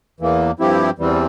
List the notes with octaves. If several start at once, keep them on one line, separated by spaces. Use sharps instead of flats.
E2 E3 A#3
G2 F3 C4 E4 G4
E2 E3 G3 C4